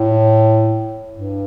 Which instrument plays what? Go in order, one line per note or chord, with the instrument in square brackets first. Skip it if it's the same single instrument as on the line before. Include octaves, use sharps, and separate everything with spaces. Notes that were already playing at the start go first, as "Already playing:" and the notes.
Already playing: [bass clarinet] A2
G2